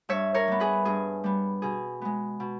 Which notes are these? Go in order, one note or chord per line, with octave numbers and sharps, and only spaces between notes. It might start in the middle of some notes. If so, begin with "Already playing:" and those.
G2 C#5 E5
A#4 C#5
G3 B3
G#4 B4
G2 G#4
G3 B3
B2 G#4
G#3 B3
B2